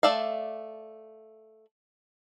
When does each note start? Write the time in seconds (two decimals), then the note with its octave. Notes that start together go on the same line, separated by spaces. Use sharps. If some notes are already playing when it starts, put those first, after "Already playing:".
0.03 A3 D5 E5 F5